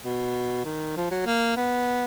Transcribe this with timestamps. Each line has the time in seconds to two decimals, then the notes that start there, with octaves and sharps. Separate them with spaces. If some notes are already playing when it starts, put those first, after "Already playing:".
0.04 B2
0.65 D#3
0.97 F3
1.11 F#3
1.26 A#3
1.57 B3